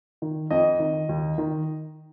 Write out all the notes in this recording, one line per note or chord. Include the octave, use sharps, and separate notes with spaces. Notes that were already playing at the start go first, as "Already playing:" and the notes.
D#3
F2 D#5
D#3
D#2
D#3